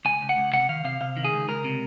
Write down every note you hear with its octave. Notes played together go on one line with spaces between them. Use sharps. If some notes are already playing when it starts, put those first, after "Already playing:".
C#2 G#5
C#2
F#5
C#2
C3 F#5
D#3 F5
C3 F5
C3 F5
D#3
G#4
C#2
C#2 A#4
C3